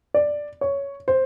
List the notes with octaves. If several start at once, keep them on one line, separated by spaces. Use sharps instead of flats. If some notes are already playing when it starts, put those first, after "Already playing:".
D5
C#5
C5